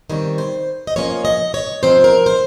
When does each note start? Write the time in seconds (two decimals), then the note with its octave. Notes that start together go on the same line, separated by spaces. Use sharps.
0.10 D#3 G3 C4 C#5
0.38 C5
0.87 D#5
0.96 F3 A#3 C#4 C#5
1.25 D#5
1.54 C#5
1.83 F3 C4 D#4 C5
2.04 A#4
2.26 C5